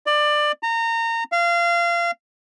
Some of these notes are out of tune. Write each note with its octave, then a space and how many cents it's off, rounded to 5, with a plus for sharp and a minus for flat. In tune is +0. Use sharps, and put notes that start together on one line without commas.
D5 +20
A#5 -25
F5 -25